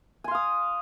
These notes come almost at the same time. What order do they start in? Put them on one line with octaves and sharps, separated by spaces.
G#5 C6 F5 D#6